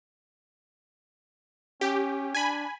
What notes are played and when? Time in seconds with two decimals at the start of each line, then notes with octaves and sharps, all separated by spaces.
1.81 C#4 G4
2.35 D4 G#5 B5